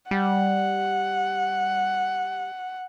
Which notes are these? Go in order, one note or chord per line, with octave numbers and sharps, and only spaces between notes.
G3 F#5